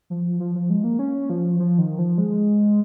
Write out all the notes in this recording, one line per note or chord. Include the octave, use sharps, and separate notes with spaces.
F3
F3
F3
G#3
A#3
C#4
F3
F3
D#3
F3
G#3